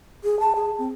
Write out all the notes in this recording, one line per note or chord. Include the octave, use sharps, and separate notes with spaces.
G#4
A5
G#4
C4